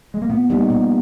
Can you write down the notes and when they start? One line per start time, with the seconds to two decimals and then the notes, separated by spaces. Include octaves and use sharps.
0.14 G#3
0.22 A#3
0.29 A#2 B3
0.50 G3 A#3 D#4
0.70 A#2